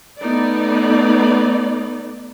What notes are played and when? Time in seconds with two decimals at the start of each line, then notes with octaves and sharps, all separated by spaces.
0.20 A3 B3 D#4 D5